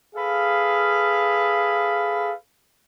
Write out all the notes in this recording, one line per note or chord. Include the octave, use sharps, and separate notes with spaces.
G#4 A4 B4 F5